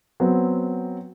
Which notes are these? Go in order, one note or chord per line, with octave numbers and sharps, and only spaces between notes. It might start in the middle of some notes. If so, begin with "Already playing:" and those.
F#3 B3 C4